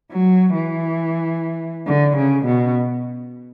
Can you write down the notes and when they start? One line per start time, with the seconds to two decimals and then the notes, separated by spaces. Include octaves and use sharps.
0.12 F#3
0.55 E3
1.87 D3
2.17 C#3
2.45 B2